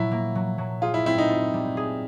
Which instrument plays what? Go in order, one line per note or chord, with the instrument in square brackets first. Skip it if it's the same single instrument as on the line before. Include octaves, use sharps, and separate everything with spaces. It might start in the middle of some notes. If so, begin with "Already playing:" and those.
Already playing: [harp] A#2 F#3 [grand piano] E4
[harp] A#3
F#3
F#3
[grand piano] F4 [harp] G#4
[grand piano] E4
[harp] C4 [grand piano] E4
[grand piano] D#4
[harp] F4
G3
G#4